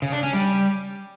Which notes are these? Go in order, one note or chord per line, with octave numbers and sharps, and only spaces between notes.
C#3
D4
C#4
G3